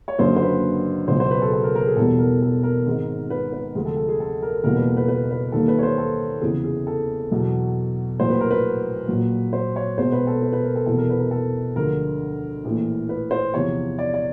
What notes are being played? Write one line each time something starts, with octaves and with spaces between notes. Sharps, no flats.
C#5
F#1 F#2 D3 F#3 A#3 C5
C5
B4
C#2 B2 F#3 C5
C5
B4
A4
G#4
A4
A#4
A#4
G#4
E1 E2 B2 G3 A4
A#4
A4
A#4
G#1 G#2 D#3 G#3
B4
B4
D2 C3 F3 G#3
A4
A4
G#4
A4
A#4
F#1 E2 B2 G3 A#3 A#4
B4
A4
B4
B4
B4
D#2 D#3 G3 A#3 A4
B4
C#5
C5
A4
F1 E2 C#3 E3 G#4
G#4
A4
E2 B2 F#3
A#1 A2 F#3 C5
B4
A#4
B4
A#1 A#2 F#3
C5
C#5
B1 B2 G#3 C5
B4
A4
B4
B4
A#4
A4
F1 E2 B2 A4
A#4
B4
A#4
A4
D2 D3 F3 G#3 A#4
A#1 A2 E3
B4
C5
E2 C3 F3 C#5
D5
D5